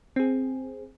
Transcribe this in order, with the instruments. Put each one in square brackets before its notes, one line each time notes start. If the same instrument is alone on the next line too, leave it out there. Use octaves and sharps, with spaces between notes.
[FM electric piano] C4 G#4